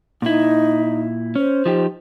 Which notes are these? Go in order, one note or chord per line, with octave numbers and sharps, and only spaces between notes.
A#2 D#4 E4
C#4 C5
F3 D#4 G4